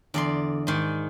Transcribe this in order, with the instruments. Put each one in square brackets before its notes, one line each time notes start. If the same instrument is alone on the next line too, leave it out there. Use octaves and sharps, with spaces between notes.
[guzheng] E2 D5 C6 [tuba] D3
[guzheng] G#2 D#3